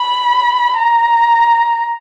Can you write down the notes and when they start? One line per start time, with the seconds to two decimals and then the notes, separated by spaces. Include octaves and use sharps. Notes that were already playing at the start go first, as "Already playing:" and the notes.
Already playing: B5
0.78 A#5